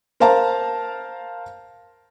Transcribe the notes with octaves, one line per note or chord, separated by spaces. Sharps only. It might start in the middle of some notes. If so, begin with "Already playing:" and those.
A#4 C5 F5 A5 A#5